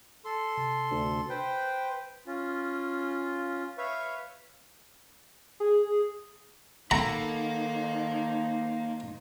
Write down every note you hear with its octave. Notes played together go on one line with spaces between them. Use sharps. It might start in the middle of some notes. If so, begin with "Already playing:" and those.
A4 C6
C3
D2
B4 C5 G5
C#4 F4
B4 C#5 E5 F5 C#6
G#4
D#3 A#3 D#4 A4 C5 F#5 A#5 B5